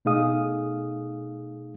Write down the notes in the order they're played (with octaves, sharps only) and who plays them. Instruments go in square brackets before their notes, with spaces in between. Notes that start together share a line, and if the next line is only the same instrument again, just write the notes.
[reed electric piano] B2 A3 D#4 G#4 F5 D#6